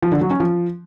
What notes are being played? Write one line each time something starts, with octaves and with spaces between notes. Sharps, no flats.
F3
D3
F#3
C#4
F3